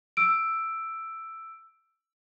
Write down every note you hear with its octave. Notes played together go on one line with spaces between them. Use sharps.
E6 D7